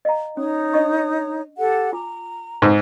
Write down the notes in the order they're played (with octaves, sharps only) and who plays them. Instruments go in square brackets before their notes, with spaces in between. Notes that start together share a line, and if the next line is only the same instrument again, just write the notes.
[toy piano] D#5 F5 A#5
[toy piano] C#4 [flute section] D#4 C#5 D#6
[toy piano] D4 D#5 C#6
[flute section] G4 A4 F#5
[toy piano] F4 G#5 D6 [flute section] A#5
[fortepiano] G#2 [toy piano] C#6 D#6